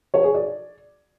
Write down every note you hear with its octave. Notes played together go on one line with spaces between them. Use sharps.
C#5
G#4
D5